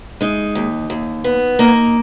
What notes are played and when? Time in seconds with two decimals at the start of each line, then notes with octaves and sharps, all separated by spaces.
0.21 G#3 D#4
0.55 D#2
0.90 D#2
1.24 B3
1.59 A#3 D#4